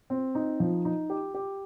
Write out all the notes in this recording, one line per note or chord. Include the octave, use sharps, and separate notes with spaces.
C4
D#4
F3
D#4
G4
G4